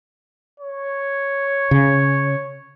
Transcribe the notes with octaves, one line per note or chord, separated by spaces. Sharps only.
C#5
C#3